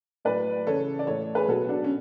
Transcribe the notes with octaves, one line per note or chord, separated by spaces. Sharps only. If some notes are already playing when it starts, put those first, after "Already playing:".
A2 F#3 B4 D5
C#3 E3 A4 C#5
D5
A2 E3 A4 C#5
G#4 B4
B2 F#3 F#4 A4
D4 F#4
C#4